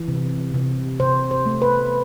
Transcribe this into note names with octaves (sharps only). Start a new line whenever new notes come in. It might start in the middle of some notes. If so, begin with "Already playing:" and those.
Already playing: E3
C3
C3
C3 C5
C5
A3
B4